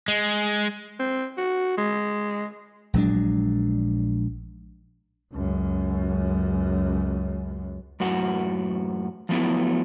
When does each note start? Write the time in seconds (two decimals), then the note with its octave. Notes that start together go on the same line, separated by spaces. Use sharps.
0.08 G#3
0.99 C4
1.38 F#4
1.78 G#3
2.94 A#1 F#3 G#3 D4
5.33 C#2 F#2
8.00 F#2 A2 F#4
9.29 F3 F#3 A3 B3 E4